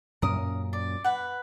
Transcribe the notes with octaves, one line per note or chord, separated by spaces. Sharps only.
F#2 A#2 C#4 A#4 D#6
D5
B4 F#5